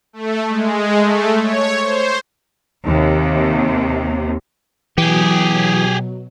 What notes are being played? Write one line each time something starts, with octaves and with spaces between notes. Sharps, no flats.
A3
G#3
A3
C#5
C5
D#2 C3
B2 E3 F#3 G4 G#4